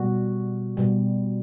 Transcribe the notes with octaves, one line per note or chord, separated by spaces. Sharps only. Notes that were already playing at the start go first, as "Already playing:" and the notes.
Already playing: B2 G3 F#4
B2 G3